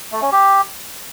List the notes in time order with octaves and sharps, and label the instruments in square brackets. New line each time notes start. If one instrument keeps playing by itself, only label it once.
[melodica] A3
C#4
G4